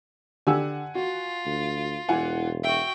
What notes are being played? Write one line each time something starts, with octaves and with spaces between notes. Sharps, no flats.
D3 G4 F#5 G#5 E6
F4 F#4
D2
E1 E3 F#5 G#5
F#4 E5 G5